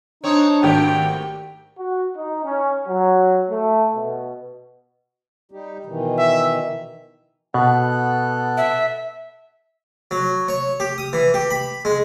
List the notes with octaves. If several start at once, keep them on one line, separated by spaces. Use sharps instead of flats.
C4 D4 D#4 C#5
G#1 A3 A#3 F#4 G4 G5
F#4
D#4
C#4
F#3
A3
B2
G3 D#4 G4
B2 D#3 E3
E5
B2 B3 A4 F#6
E5
F#3
C#5
G4
D#6
E3
G4
B5
G#3